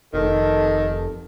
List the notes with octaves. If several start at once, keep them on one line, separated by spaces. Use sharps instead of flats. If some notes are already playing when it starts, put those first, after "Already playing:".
F1 D#3 A4